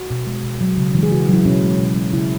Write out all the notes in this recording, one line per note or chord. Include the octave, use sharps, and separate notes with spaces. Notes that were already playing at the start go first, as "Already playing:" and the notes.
Already playing: F#4
B2
G#3
B2
F#3
C#3
E3 G#3
G#4
C#3 F#4
F#3 E4
B2 C#4
G#3
B2
G#3
C#3 E4